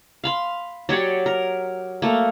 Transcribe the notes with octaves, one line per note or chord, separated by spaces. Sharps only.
F5 B5 C6
F#3 G4 C#5 D5
A#4
A3 A#3